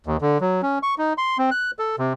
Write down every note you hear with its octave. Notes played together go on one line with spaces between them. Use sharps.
D#2
D3
F#3
C#4
C#6
D#4
C6
C4
F#6
A4
C3